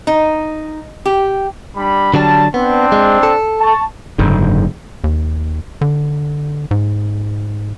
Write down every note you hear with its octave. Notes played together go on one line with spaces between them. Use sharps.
D#4
G4
G3 D4 B5
D3 F#3 G3 D4 A5
B3 C4 D4
G#3
A4
A5 C#6
F#1 G#2 D3
D#2
D3
G#2